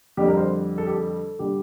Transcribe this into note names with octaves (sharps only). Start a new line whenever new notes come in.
F2 D3 G3 G4
A#4
C5
A4
G4
A4
D3 G3 G4